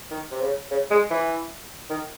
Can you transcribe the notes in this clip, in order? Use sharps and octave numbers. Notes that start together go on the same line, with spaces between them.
D#3
C3
C#3
C#3
G#3
E3
D#3